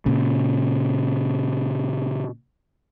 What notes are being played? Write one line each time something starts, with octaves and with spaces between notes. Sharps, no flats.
A#2 C#3